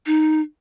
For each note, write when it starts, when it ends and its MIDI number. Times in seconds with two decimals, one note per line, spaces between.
0.06 0.41 63